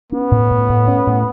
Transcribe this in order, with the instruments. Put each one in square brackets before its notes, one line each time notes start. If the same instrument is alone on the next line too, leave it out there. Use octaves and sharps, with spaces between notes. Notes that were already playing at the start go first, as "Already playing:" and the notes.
[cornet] B3 [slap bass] C#4
[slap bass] A2
A2
A2
C#4
A2